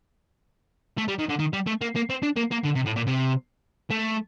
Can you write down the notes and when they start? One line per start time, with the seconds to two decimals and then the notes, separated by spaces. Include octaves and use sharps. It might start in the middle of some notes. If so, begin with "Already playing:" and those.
0.98 A3
1.08 G3
1.19 D#3
1.29 D3
1.39 D#3
1.53 G3
1.67 A3
1.82 A#3
1.96 A#3
2.10 C4
2.23 D4
2.36 A#3
2.51 A#3
2.64 D3
2.75 C3
2.86 A2
2.96 A#2
3.07 C3
3.90 A3